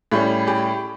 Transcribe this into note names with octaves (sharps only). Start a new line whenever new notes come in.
A2 G3 C#4
G4